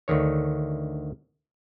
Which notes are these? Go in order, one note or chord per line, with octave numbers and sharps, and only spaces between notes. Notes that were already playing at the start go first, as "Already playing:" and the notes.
D2 D3 D#3 C#5